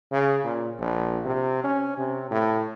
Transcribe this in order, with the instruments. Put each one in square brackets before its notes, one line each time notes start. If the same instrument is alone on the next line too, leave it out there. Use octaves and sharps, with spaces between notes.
[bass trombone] C#3
A#2
A#1
C3
C#4
C3
A2